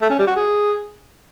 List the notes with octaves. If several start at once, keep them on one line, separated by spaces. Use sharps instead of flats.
A3
C#4
G3
F#4
G#4